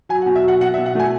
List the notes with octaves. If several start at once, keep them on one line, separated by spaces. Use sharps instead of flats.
F#3 G#5
F#5
B2
E5
F#3 F#5
B2 F#5
E5
B2
F#5
A3 G#5